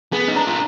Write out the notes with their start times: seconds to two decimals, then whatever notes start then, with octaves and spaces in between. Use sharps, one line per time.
0.12 B3 G#4
0.28 D#4
0.35 D4 A#5
0.47 F4